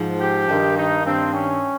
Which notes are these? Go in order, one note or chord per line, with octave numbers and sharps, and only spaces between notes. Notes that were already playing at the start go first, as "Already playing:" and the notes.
Already playing: G#2 F3
G4
G2 D#3
D#4
G2 D#3 C4
C#4